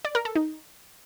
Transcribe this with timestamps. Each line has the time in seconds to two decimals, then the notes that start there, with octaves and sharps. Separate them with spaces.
0.05 D5
0.15 A#4
0.25 A4
0.36 D#4